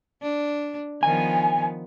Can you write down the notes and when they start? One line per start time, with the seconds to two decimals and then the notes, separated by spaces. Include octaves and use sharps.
0.22 D4
1.03 D#3 F3 B3 G#5